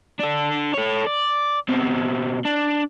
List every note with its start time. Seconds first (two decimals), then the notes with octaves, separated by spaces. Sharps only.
0.20 D4 A4
0.74 A4 C#5
1.07 D5
1.69 B2 C4
2.45 D4